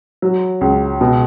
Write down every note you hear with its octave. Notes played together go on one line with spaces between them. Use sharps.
F#3
C#2
B2